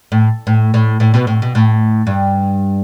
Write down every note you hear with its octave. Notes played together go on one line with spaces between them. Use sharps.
A2
A2
A2
A2
B2
A2
B2
A2
G2